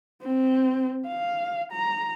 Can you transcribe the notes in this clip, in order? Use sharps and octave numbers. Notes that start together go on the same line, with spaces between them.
C4
F5
A#5